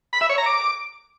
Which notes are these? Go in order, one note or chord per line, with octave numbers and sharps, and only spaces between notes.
B5
E5
C#5
A#5
D6